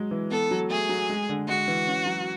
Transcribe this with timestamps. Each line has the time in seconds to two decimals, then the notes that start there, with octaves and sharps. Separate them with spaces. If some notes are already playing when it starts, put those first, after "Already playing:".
Already playing: F#3 G#3
0.11 E3
0.31 B3 A4
0.51 F#3
0.70 A3 G#4
0.89 F#3
1.09 G#3
1.29 D3
1.48 G#3 F#4
1.68 E3
1.87 C#4
2.06 F#3